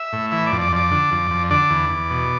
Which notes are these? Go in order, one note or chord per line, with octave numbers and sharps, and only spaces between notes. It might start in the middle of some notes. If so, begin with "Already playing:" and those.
Already playing: E5
A2
E3 E5
D5
F2
D5
F2 D5
D3
F2
F2
D3 D5
E2
E2
B2